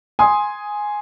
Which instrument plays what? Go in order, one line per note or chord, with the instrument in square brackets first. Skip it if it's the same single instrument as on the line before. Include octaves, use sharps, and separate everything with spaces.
[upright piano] G#5 C6 D#6